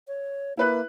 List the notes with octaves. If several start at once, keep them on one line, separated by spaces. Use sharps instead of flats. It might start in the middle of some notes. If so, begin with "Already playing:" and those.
C#5
A#3 E4 B4 F#6